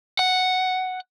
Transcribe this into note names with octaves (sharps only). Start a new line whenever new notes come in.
F#5